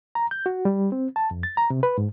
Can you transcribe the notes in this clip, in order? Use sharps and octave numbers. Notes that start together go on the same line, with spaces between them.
A#5
G6
F#4
G3
C4
A5
F2
A6
A#5
C3
B4
G#2